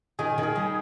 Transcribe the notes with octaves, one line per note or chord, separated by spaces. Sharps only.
D#3 G#4
D#3
G#4
G3